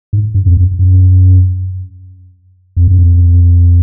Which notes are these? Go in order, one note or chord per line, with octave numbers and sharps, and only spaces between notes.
G#2
G2
F2
F#2
F#2
F2
F#2
F2